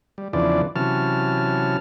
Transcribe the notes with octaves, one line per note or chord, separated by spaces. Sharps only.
G3
E2 C#3 E3 F3 D4 D5
C3 E3 F#3 C#4 A5 F6